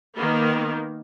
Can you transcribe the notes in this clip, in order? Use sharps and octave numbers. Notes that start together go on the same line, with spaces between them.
D#3 A#3 B3